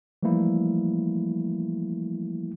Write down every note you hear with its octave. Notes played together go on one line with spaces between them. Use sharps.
E3 F3 G3 A3 A#3 E4